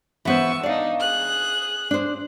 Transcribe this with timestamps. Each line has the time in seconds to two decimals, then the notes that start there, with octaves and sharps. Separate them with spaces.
0.25 E3 B3 C5 C#6 E6
0.63 D4 D#4 D5 F5
0.99 G#4 F#6
1.91 D4 C5